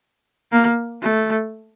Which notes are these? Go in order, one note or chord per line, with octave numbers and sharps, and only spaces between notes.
A#3
A3